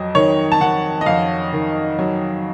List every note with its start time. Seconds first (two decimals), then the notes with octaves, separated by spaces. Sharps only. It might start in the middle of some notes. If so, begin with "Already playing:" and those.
Already playing: F2 F#3 D#5
0.15 D#3 C#5
0.52 A5
0.61 D#3 F#5
1.01 D#5
1.06 F2 F5
1.53 D#3
1.99 F#3